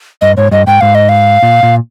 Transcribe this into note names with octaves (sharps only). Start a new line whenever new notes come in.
G2 D#5
G#2 C#5
G2 D#5
G#2 G5
G#2 F5
D#5
F5
A#2
A#2